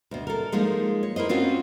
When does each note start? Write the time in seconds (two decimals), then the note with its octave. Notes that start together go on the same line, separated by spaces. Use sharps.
0.11 D2 B2
0.27 A4 A#4
0.52 F3 G#3 A#3 D#4
1.03 C#5
1.16 E4 A#4 C5 D#5
1.29 C4 C#4 F4 F#4 C5